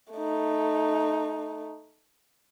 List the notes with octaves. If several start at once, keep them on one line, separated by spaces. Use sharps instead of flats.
A3 D#4